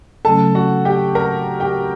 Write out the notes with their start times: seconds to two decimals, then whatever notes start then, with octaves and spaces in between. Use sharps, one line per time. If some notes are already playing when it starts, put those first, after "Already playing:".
0.25 C#3 F#3 A3 C#4 A4 A5
0.55 F#4 F#5
0.85 G4 G5
1.15 A#4 A#5
1.60 G4 G5